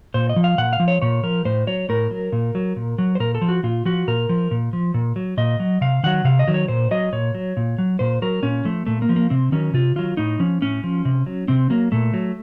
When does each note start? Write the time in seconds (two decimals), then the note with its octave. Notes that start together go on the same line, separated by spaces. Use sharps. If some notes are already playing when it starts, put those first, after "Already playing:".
0.14 A#2 C5
0.29 D#5
0.36 F3
0.44 F5
0.58 A#2 F#5
0.73 F5
0.80 F3
0.88 C#5
1.02 A#2 C#5
1.23 F3 A#4
1.45 A2 C5
1.67 F#3 C#5
1.89 A2 A#4
2.11 F#3
2.32 A#2
2.55 F#3
2.76 A#2
2.98 F#3
3.15 C5
3.20 A#2 A#4
3.35 A4
3.41 F3
3.49 F#4
3.64 A#2 F4
3.85 F3 F#4
4.08 A#2 A#4
4.29 F3
4.51 A#2
4.73 F3
4.94 A#2
5.16 F#3
5.37 A#2 D#5
5.60 F#3
5.81 C3 F5
6.04 D#3 F#3 F#5
6.25 C3 F5
6.39 D#5
6.48 D#3 F#3
6.54 C#5
6.68 A#2 C5
6.91 F#3 D#5
7.13 A#2 C#5
7.35 F#3
7.57 A#2
7.78 F#3
7.99 A#2 C5
8.22 F#3 A#4
8.43 A#2 C#4
8.65 F3 A3
8.86 A#2 A3
9.02 A#3
9.09 F3
9.16 A#3
9.30 C3 C4
9.52 D#3 F#3 C#4
9.74 C3 F4
9.96 D#3 F#3 F4
10.17 A2 D#4
10.40 F3 C#4
10.61 A2 C#4
10.84 F3
11.05 C3
11.26 F#3
11.48 C3 C4
11.70 F#3 A#3
11.92 A#2 A3
12.14 F#3